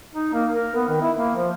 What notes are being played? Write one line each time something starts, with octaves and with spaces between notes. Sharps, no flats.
D#4
A#3
A#4
B3
D#3
E4
A#3
F3